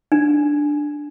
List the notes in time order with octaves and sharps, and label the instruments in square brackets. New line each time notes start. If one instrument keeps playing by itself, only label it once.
[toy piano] D4